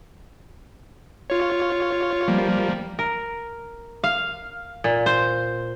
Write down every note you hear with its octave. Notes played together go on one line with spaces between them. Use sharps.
F4 C#5
F3 G3 A#3
A#4
F5
A#2
C5